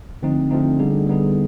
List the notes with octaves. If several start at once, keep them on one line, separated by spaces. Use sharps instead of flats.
D3 F3 A3 C4 D#4
D3 F3 A3 C4 D#4
D3 G3 B3 D#4 G#4
D3 G3 B3 D#4 G#4